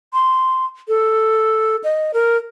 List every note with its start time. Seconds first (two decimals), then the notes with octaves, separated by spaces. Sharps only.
0.13 C6
0.88 A4
1.84 D#5
2.14 A#4